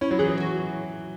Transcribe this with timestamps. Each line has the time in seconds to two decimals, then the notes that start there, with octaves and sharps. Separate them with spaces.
0.01 C#4 E4
0.11 F#3
0.19 E3 G#4
0.28 F#3
0.37 F#4